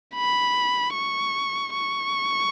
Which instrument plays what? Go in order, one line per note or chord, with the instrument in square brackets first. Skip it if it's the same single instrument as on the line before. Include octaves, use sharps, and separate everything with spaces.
[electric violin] B5
C#6
C#6